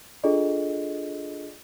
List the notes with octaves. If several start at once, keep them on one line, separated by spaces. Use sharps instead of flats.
D4 F4 G#4 A4 D5 D#5